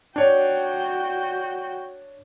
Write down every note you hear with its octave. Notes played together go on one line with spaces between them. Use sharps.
D4 F#4 C#5 G5